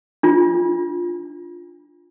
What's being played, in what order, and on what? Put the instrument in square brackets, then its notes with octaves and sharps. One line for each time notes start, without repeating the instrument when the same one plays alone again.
[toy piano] D4 F4